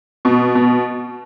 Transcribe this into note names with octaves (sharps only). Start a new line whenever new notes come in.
B2
B2